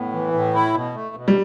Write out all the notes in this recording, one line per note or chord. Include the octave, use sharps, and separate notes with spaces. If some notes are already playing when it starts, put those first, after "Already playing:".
Already playing: A2 B3
E3
A2
E4
B2
A3
B2
G3